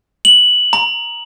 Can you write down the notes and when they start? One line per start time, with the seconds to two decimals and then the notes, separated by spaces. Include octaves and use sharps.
0.25 F#7
0.73 A#5